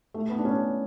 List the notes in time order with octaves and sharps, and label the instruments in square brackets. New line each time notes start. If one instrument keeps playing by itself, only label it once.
[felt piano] A3
B3
D4
C#4